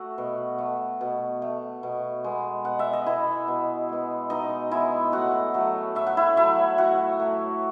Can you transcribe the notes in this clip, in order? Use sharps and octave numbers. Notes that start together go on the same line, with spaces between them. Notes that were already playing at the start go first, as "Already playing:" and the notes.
Already playing: A3 F#4 E5 F#5
B2
A3
B2
A3
B2
G#3 B3
B2 F#5
E5
D#5
G#3 B3 E4 E5
B2
G#3 B3
B2 D#4 D#5
G#3 B3 E4 E5
A2 F#4 F#5
F#3 A3
A2 E5
F#5
E4 E5
F#3 A3 E4 E5
A2 F#4 F#5
F#3 A3